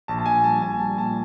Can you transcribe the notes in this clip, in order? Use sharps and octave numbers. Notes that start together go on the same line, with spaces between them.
A#1 A5
A5
A#1 G#5
G3 A5
A#1 G#5
G3 A5
A#2 A5